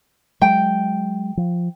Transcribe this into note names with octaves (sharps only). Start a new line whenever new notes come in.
F#3 G#3 G5
F3